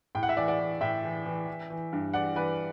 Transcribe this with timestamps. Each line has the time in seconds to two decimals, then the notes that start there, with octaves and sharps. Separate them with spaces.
0.15 A2 G5
0.23 F#5
0.29 E5
0.36 E3 D5 F#5
0.48 D5 F#5
0.60 E3
0.81 A2 E5 G5
1.04 E3
1.26 E3
1.47 E3
1.70 E3
1.93 G2
2.14 E3 D5 F#5
2.36 E3 B4 D5